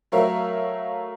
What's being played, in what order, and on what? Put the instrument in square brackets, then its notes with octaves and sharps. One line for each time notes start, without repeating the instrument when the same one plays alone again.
[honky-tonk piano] F#3 A3 A#4 C#5 E5 F5